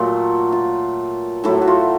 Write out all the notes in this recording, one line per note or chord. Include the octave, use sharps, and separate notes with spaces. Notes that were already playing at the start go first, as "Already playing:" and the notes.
Already playing: A#2 F#3 A3 F4
F4
A2 F#3 A3 E4
F#4
F4